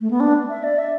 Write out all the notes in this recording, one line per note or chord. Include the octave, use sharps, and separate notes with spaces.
A3
B3
D4
E5
D5
E5